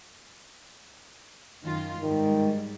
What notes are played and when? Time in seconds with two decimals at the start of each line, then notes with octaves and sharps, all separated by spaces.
1.63 F#2 D#3 F4
2.00 G#2 D#3 G3